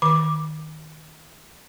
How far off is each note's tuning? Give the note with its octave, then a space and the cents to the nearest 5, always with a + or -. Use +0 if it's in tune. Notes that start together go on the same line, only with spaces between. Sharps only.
D#3 +0 D6 +0